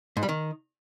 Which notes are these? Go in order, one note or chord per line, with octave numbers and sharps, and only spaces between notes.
G#2
G3
D#3